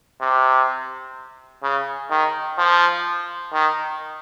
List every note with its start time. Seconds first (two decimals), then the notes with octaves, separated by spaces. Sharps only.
0.21 C3
1.63 C#3
2.10 D#3
2.58 F3
3.53 D#3